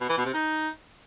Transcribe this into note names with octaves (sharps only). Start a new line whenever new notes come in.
B2
E3
B2
C3
D#4